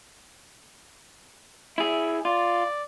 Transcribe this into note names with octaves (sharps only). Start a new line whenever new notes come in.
E4 G#4 E5
F4 D5